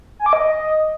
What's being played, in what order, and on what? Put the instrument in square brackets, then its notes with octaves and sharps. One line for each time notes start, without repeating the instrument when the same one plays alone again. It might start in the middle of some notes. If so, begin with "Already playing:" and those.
[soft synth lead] G#5
D6
D#5